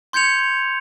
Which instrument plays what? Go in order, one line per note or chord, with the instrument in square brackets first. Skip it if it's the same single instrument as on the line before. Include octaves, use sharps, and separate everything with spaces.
[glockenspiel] C6 G6 G#6 C#7 F7